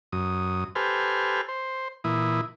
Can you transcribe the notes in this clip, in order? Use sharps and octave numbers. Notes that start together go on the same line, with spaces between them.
F#2 D#6
G4 A4 B4 C5 G#5 F6
C5
A#2 E3 E4 D#6